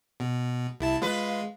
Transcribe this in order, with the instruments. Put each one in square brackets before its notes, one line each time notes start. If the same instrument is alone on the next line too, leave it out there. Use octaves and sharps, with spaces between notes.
[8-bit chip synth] B2
C2 E4 A5
[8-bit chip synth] G#3 [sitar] F4 B4